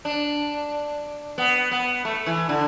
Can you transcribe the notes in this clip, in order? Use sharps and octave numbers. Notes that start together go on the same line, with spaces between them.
D4
B3
B3
A3
E3
D3